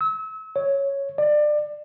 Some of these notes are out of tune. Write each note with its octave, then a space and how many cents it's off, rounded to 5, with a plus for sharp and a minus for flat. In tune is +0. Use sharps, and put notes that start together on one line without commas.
E6 -35
C#5 +0
D5 +25